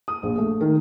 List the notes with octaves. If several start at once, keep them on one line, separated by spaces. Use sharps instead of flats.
D#6
A#1
A3
D#3